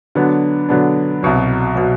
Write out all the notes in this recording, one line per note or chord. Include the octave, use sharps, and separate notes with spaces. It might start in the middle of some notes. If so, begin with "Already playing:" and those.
D3 F#3 B3 D4
D3 F#3 B3 D4
C2 B2 F#3
B2 F#3